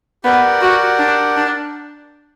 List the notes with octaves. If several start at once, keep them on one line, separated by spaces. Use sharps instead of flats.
B3 G4 A#4 D5 F#5
F#4
D4
D4